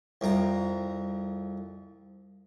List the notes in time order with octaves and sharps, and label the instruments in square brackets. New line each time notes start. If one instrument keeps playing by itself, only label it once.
[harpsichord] C2 F2 A#5